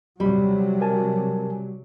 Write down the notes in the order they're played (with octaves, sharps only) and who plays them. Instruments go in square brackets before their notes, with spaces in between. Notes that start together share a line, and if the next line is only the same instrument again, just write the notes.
[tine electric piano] D#2 B5 [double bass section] C3 F#3 [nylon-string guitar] G3
[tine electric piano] A#4 G#5 A5